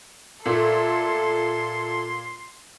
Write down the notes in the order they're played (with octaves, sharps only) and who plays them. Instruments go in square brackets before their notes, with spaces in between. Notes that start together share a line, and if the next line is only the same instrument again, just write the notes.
[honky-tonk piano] A#2 [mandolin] A3 [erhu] A4 [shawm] C6